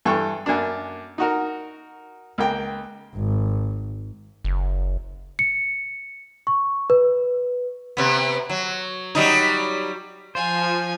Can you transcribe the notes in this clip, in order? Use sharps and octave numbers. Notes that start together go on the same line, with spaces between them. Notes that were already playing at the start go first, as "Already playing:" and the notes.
G2 E3 A4 G5 C#6
F#2 A#3 D4
D#4 F#4 A#4
C#2 A#3 G5
G#1
F#1
C#7
C#6
B4
C3 B3
F#3
F#3 G3 D#4
F3 F4 C5 G#5